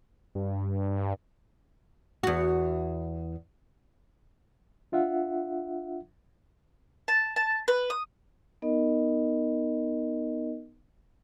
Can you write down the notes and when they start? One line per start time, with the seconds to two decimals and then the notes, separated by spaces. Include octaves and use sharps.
0.35 G2
2.23 E2 F#4
4.92 D4 F4 E5 F#5
7.08 A5
7.36 A5
7.68 B4
7.90 D#6
8.62 B3 D#4 A#4 D#5